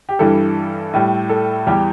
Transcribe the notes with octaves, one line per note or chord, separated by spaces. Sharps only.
G4
G2 E3 G3 A4
A2 G3
A4
E2 E3 G3 G4